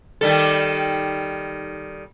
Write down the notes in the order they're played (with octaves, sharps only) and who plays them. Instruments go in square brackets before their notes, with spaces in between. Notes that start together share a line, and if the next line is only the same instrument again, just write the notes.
[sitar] D#3 G3 A4